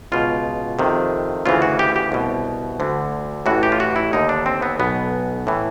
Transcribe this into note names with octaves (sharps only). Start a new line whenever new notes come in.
C#2 B2 F4
F2 C3 D#3
D2 C#3 E3 F4
F#4
G4
G4
C2 B2
D2 D3
A1 A2 E3 F#4
G4
F4
F#4
E4
D#2 D3 D#4
D4
C4
B3
B1 B2 B3
A2 E3